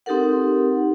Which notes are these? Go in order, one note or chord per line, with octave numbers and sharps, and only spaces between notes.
C4 D#4 G4 A4 A#4 F#5